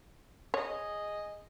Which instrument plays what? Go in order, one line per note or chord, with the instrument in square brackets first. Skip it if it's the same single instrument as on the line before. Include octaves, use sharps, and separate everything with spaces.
[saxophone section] G#4 D#5 [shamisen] C#5